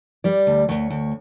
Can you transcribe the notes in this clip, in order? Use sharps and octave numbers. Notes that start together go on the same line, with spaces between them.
G3 D5
D2
D2 C#5
D2